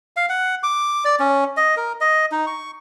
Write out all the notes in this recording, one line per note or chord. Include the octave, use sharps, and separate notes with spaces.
F5
F#5
D6
D5
C#4
D#5
A#4
D#5
D#4
C#6